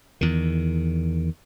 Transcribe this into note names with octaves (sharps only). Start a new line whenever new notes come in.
E2 D#3